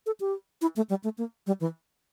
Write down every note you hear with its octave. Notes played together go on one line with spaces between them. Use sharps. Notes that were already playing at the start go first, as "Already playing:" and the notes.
A4
G4
E4
A3
G3
A3
A#3
G3
E3